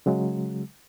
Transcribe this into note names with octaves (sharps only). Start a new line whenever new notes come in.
C#3 F#3 G#3